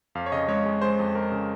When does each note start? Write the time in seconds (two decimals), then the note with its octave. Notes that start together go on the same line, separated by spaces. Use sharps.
0.15 F2 F5
0.26 C#5
0.32 C#3 D#5
0.48 G#3 C#5
0.66 G#3
0.81 G#3 C5
0.99 F2
1.15 G#3 A#4
1.32 C#3